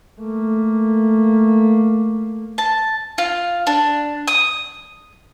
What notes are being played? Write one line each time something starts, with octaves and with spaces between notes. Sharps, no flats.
A3 A#3
A5
F4
D4
D#6